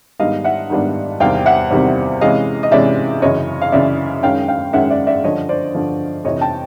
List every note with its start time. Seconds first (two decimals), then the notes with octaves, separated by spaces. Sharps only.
0.20 G#2 D#3 G3 B3 D4 D#5 F5
0.44 E5 F#5
0.70 G#2 D#3 G3 B3 D4
1.20 E2 C3 D#3 G3 C4 F5 G5
1.46 E5 F#5
1.71 E2 C3 D#3 G3 C4
2.21 C3 E3 G#3 C#4 D#5 F5
2.63 D#5
2.72 C3 E3 G#3 C#4 D5 E5
3.22 F#2 C#3 E3 C#5 D#5
3.62 F5
3.72 F#2 C#3 E3 D5 E5
4.23 F#2 D#3 G#3 C#4 F5 G5
4.48 F5 G5
4.73 F#2 D#3 G#3 C#4 E5 F#5
4.90 D5 E5
5.07 D5 E5
5.24 G2 D3 F3 C#5 D#5
5.49 C5 D5
5.74 G2 D3 F3
6.24 F2 C3 E3 C#5 D#5
6.41 G5 A5